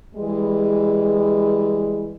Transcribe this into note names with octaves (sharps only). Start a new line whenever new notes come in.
E3 G3 G#3